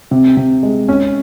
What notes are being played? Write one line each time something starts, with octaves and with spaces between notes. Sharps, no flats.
C3
C3
G#3
C#4